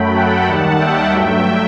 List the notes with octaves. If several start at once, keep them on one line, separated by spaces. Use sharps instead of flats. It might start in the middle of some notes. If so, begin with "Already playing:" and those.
Already playing: F#2 F#3 A3 G5 B5
F#5 A5
D#2 D#3 G3
E5 G5
G2 F#3 A3